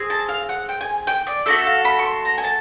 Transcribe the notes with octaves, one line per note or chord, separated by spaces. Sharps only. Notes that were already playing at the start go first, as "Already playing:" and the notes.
Already playing: C4 G#4
A5
F5
F#5
G5
G#5
G5
D5
A3 D4 F#4 A4 E5
F5
B5
C#6
C6
A#5
G#5
A5